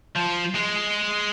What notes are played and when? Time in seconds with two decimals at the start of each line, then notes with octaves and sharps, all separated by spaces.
0.16 F3
0.55 G#3